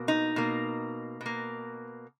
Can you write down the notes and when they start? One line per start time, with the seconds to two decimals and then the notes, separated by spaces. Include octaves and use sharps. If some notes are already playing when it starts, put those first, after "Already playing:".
Already playing: B2 A#3
0.08 D#4
0.36 B2 A#3
1.21 B2 A#3